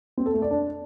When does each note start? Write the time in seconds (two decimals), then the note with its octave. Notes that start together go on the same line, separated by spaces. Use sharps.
0.17 C4
0.26 A4
0.34 A3
0.42 D5
0.51 D4